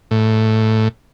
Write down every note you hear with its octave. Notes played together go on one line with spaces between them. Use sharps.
A2